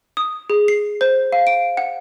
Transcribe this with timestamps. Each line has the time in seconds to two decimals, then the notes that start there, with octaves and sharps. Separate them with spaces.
0.17 D#6
0.50 G#4
0.68 C7
1.01 C5
1.32 F5
1.47 D7
1.77 F#5